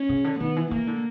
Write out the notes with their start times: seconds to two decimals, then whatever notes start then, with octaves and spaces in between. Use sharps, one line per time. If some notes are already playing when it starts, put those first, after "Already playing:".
Already playing: C#4
0.09 C#3
0.24 D3
0.40 D#3 B3
0.56 E3
0.71 E3 A#3
0.87 D3